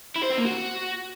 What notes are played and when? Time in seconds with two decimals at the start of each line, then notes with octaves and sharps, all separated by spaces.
0.16 E4
0.23 C5
0.30 C4
0.38 A#3
0.45 F#4